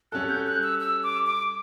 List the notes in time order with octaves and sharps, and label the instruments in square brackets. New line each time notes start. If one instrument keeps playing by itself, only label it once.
[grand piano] G3 C#4 F#4 A4 [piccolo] F#6
[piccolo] G6
F#6
E6
E6
D6
D6